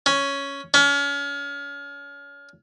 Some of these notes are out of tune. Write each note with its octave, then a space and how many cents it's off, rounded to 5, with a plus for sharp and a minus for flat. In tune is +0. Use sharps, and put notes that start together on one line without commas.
C#4 +5
C#4 +35